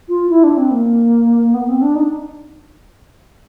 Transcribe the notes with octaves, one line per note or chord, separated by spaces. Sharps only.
F4
E4
D4
C4
A#3
B3
C4
D4
D#4